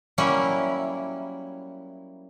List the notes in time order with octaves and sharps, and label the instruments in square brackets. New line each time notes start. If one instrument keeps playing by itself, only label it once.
[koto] F#3 G3 A#3 C#4 E4